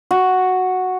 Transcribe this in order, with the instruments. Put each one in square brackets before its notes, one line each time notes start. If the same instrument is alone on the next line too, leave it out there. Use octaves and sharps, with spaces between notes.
[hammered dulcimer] F#4